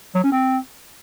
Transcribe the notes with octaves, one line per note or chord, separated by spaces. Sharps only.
F#3
C#4
C4